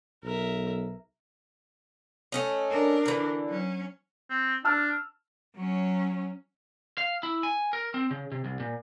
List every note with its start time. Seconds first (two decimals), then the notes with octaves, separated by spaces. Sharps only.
0.23 B1 A#4 E5
2.32 A3 C#4 D#5
2.70 D4 A#4
3.06 D3 E3
3.48 F#3 C#4
4.30 C4
4.65 D4 A5 E6 F6
5.56 F#3 C#4
6.98 F5
7.23 E4
7.43 G#5
7.73 A#4
7.94 C4
8.11 C#3
8.32 C3
8.45 C2
8.60 A#2